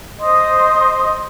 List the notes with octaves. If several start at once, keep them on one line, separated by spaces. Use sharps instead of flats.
C5 D#5 C6 D#6